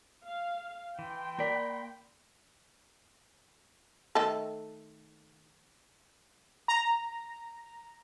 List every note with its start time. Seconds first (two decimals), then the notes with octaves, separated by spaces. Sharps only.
0.25 F5
0.99 E3 G5 C6
1.38 A#3 A#4 D5 B5
4.15 D#3 A3 A4
6.68 A#5